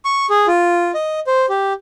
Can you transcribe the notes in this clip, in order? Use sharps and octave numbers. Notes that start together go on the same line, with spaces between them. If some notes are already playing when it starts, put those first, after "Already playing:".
C#6
G#4
F4
D#5
C5
G4